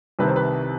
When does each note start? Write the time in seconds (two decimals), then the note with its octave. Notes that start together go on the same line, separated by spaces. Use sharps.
0.19 C2 C3 D#3 B4
0.28 C5
0.36 B4